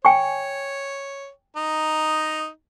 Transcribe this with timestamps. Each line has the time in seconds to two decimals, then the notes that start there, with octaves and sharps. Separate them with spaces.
0.05 C#5 G5 G#5 C#6
1.56 D#4 A#5